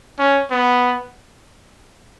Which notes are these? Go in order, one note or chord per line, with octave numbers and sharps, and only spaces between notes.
C#4
B3